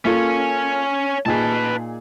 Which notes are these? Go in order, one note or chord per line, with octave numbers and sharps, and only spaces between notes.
A#3 C#4 F4 A4 C#5
A#2 D#4 G#4 B4 A5